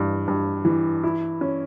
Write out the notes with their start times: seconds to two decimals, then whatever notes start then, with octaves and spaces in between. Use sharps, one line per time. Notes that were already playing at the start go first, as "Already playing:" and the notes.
Already playing: G2 E3
0.28 G2
0.65 E3
1.04 E4
1.41 C#4